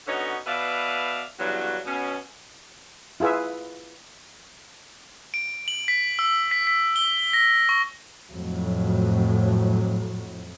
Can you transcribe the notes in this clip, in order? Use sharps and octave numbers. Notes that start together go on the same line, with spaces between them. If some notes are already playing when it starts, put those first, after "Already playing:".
D3 B3 C#4 D#4 F#4 C#5
B2 B4 D5 E5 F5
E2 G2 C#3 F#3
B2 C#4
E4 F4 G#4 B4 E5
D7
F#7
B6
E6
B6
B6
G7
A#6
C#6
F2 A2 F#3